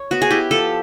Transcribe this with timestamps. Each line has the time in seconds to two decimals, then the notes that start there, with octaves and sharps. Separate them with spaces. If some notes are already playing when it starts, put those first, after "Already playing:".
Already playing: C#5
0.11 B3 F#4
0.22 G#4
0.31 E4 G4
0.51 F3 A4